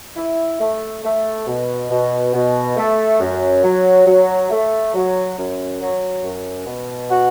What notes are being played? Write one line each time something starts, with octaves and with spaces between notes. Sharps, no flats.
E4
A3
A3
B2
B2
B2
A3
F#2
F#3
F#3
A3
F#3
F#2
F#3
F#2
B2
F#4